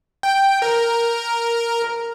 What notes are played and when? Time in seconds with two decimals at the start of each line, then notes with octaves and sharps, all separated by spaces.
0.23 G5
0.62 A#4